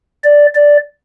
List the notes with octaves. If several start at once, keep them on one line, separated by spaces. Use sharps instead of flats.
D5
D5